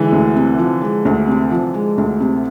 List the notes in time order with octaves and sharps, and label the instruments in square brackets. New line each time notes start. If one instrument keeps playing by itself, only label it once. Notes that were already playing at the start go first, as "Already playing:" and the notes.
Already playing: [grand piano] D3 E3 [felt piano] G#3
[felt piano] D2
C3
F3
G#3
D2
C3
F3
G#3
D2
C3